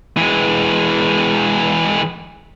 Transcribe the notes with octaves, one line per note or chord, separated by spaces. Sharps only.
E3 G#3